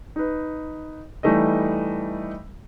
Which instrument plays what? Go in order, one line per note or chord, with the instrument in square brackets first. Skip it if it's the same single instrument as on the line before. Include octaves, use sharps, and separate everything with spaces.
[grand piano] D#4 B4
E3 G3 A3 D#4 D#5